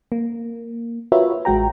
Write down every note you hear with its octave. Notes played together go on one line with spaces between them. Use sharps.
A#3
F4 F#4 A#4 B4 C#5 E5
A1 G#3 F#4 G5 A#5